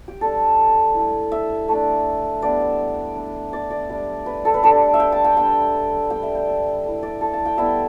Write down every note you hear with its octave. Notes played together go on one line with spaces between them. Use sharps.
G4
G3 D4 A4
A3 E4
E5
A3 D4
G3 B3 D4 D5
E5
A3 D4
D5
D5
G3 D4
B4
A4
B4
G3 D4 A4
E5
G5
A5
G5
G3 D4 G5
G3 D4 G5
E5
G5
E5
A3 E4
D5
A4
A5
G5
G3 B3 E4 E5